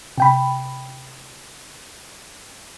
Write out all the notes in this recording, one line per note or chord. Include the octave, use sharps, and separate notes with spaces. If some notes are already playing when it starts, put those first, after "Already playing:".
C3 G5 B5